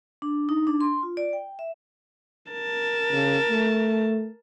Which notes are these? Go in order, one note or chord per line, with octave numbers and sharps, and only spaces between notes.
D4
D#4
D4
C6
F4
D5
G5
E5
A#4 A5
C#3
A3